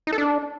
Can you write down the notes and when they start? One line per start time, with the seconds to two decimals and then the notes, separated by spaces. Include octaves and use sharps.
0.07 D#4
0.12 A4
0.18 D4